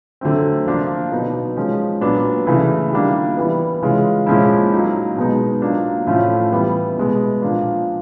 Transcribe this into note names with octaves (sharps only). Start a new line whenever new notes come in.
D3 F#3 A3 C4
F3 A#3 D4 F4
B2 F#3 B3 D#4
F3 G#3 C#4
A#2 F#3 B3 D4
C#3 E3 A3
D#3 G3 A#3 D4 F4
E3 G3 B3
C#3 E3 G#3 C#4 F4
A#2 F3 G#3 C#4 E4
F#3 A#3 D#4
B2 G#3 B3 D#4
F#3 A#3 D4 F4
A2 F3 A3 C#4 F4
E3 G3 B3
B2 G#3 B3
A#2 F3 A#3 D4 F4